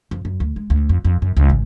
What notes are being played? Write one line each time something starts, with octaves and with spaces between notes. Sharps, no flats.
F2
F#2
D2
G#3
D2
F2
F2
F#2
C#2
G#1